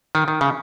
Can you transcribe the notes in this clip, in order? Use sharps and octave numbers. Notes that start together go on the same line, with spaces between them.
D#3
D#3
C#3